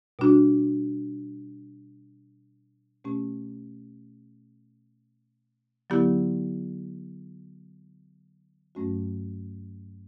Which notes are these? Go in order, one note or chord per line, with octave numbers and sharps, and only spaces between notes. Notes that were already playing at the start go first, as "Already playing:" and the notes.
B2 G3 D4 F#4
B2 A3 C#4 G4
D3 F#3 B3 E4 G4
G2 F#3 A3 C#4 F#4